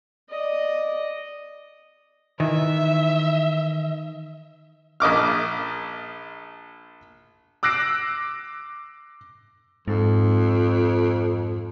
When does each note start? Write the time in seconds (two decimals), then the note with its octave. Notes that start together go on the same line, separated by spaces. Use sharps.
0.30 D5 D#5
2.40 D#3 E3 E5
5.00 A#1 D#5 D6 F6
7.63 D6 E6 F#6 A#6 C7 D7
9.88 F2 G#2